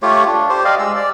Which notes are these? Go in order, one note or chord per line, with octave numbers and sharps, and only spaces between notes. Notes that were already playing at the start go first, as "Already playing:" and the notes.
A3 F4 G4 C#5
D4
G4 C5
G4 D5 D#5 F5
G#3 E6
D5